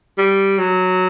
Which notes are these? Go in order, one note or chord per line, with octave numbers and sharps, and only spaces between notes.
G3
F#3